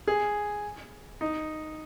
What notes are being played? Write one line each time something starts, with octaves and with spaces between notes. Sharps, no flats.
G#4
D#4